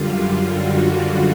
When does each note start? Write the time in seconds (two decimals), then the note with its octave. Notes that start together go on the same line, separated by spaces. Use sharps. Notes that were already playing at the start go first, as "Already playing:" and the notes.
Already playing: F#2 D3 G3 F4
0.14 F4
0.49 F#4